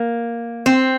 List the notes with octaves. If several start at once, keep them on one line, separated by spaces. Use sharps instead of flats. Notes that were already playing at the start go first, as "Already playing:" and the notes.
Already playing: A#3
C4